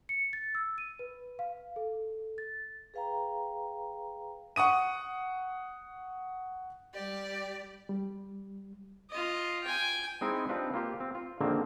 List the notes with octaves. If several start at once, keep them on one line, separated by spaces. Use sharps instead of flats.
C#7
A6
E6
D#7
B4
F5
A4
A6
G#4 B4 F5 G5 A#5
F#5 C#6 D#6 D#7
G3 G4 D5
G3
F4 D#5
G5 G#5
G#3 C4 D#4 E4
C4 D4 D#4 F4 G4 B4
A#3 F4 G4
C4
F4
A#1 D3 D#3 A#3 C4